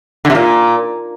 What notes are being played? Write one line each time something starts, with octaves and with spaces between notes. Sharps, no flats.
D3
C3
A#2